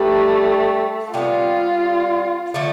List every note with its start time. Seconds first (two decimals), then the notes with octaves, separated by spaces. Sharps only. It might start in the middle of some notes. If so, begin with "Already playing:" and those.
Already playing: G3 A3 D4 G4 B4
1.13 C3 G3 B3 F4
2.54 D3 F3 A3